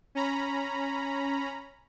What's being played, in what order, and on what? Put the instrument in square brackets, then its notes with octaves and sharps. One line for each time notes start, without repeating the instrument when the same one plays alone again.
[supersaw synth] C#4 A#5 B5